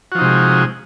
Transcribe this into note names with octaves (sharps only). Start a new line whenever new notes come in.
C3 F3 G#3 D#4 F#4